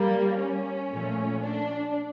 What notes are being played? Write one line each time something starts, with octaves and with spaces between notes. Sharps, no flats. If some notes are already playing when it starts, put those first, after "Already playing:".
Already playing: G3 A#3
C#4
A#2 F3 A3
D4